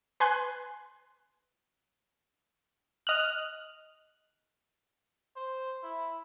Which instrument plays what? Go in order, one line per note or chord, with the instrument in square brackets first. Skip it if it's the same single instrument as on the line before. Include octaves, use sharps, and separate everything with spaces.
[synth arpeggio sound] B4 G#5 C6 F#6
[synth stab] D#5 F6 F#6
[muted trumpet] C5
E4